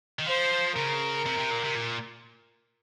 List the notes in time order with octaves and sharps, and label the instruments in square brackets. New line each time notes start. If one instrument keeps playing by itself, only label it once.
[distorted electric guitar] D#3
[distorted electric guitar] F3 [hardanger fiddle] C5
[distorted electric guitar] C#3 [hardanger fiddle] A#4
[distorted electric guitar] C3
C3
A#2
C3
A#2